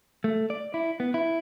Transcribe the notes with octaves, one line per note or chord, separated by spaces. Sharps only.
A3
D5
E4
B3
E4